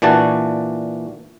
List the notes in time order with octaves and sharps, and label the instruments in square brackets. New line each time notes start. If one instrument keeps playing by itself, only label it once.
[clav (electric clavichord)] A#2 E3 D4 F#4 A5